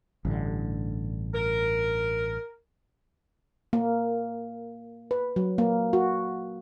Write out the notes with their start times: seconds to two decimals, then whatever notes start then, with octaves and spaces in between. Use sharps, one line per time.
0.25 A1 G2 D3
1.33 A#4
3.73 A#3
5.11 B4
5.36 F#3
5.58 A#3
5.93 F#4